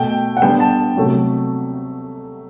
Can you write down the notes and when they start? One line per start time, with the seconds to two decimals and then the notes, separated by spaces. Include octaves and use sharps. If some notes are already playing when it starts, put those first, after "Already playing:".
Already playing: B2 A3 G5
0.37 F#5
0.42 D3 G3 B3 G5
0.60 A5
0.96 C3 F#3 A3